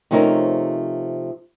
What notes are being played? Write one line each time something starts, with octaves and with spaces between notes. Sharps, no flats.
C3 F3 A3 C#4 D#4 A#4